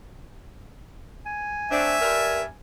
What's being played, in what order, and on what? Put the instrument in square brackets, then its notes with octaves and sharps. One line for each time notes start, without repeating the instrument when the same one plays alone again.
[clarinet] G#5
[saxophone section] A3 C4 D4 [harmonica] E5
[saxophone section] G2 G3 A#4